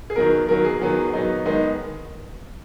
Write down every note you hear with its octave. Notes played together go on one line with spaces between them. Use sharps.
G#4
D#3 F#3 B3 A#4
D#3 F#3 B3 A#4
G#4
D#3 F#3 B3
D#3 F#3 B3 D#4
D#3 G#3 B3 D#4